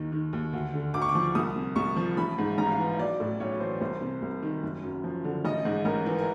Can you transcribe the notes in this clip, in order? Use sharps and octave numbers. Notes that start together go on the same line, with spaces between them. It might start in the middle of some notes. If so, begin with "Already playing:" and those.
Already playing: D#2 D#3
D#3
D#2
D2
D3
D2 D6
C#6
D6
F3
C2 D#6
C3
C2 C#6
F3
A1 B5
G#2
A1 A#5
F5
E3
B1 D5
A2
B1 C#5
E3 C5
C2 C5
C3
C2
D#3
F#1
F#2
F3
D3
A1 D#5
G#2
A1 A#4
E3
A#4